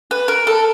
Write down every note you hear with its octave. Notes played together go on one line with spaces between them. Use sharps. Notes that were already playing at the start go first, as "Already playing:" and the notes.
B4
A#4
A4